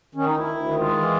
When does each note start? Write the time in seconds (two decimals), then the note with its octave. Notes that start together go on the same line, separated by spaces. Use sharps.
0.15 D#3 C#4
0.26 D#4
0.31 D2
0.37 E4
0.47 D2
0.64 D#3
0.79 G#3 F4
0.96 E3